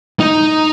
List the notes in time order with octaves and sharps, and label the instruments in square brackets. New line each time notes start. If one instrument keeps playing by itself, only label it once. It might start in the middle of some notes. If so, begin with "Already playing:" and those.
[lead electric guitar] D#4